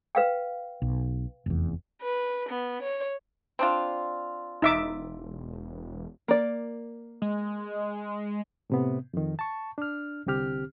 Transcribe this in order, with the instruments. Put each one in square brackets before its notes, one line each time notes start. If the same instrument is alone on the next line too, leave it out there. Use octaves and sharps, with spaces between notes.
[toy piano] B4 F5 G5
[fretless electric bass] B1
F1 E2
[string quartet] B4
B3
C#5
[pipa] C4 D4 F4
[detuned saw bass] E1 [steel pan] D#4 E5 D6
[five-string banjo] A#3 D5
[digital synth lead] G#3
[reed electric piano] A2 C3 B3
F2 D#3
A5 C#6
D4 F6
C2 D3 C4 G4 F6